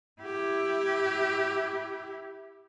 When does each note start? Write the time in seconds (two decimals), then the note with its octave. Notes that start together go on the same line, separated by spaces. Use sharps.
0.22 E4 G4